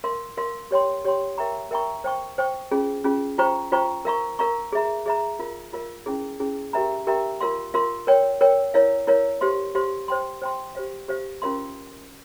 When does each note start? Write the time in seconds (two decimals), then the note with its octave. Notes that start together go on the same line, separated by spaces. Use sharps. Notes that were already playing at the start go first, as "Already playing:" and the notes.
0.04 A#4 F5 C6
0.37 A#4 F5 C6
0.71 G4 C#5 G5 C6
1.05 G4 C#5 G5 C6
1.38 A#4 E5 G5 A#5 C#6
1.71 A#4 E5 G5 A#5 C#6
2.04 C5 G5 C#6
2.38 C5 G5 C#6
2.71 C#4 F4 G#4
3.04 C#4 F4 G#4
3.38 F4 C5 G5 A#5 C#6
3.72 F4 C5 G5 A#5 C#6
4.05 A#4 F5 A#5 C#6
4.39 A#4 F5 A#5 C#6
4.72 G#4 E5 A#5
5.06 G#4 E5 A#5
5.39 F4 A#4 F5
5.73 F4 A#4 F5
6.06 C#4 E4 G#4
6.40 C#4 E4 G#4
6.73 G4 A#4 E5 G5 A#5
7.07 G4 A#4 E5 G5 A#5
7.41 F4 A#4 F5 C6
7.74 F4 A#4 F5 C6
8.07 A#4 C#5 G5
8.41 A#4 C#5 G5
8.74 E4 A#4 C#5 F5
9.07 E4 A#4 C#5 F5
9.41 G4 C5 F5 C6
9.75 G4 C5 F5 C6
10.08 C5 G5 C6
10.42 C5 G5 C6
10.75 G4 C5 F5
11.08 G4 C5 F5
11.42 C#4 F4 A#4 F5 C6